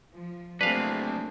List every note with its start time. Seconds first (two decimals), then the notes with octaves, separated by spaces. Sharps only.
0.13 F3
0.61 F#3 A3 A#3 C4 D4 G#4 B4 F5